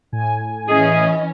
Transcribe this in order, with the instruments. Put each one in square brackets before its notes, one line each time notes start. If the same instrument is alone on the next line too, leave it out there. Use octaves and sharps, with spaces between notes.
[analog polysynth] A2 G#5
[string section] E3 C#4 [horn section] G#4 [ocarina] D#5